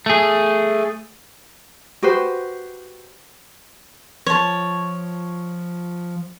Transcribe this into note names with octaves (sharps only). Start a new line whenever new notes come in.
A3 G#4
F#4 G4 B4 C5
F3 C#5 A5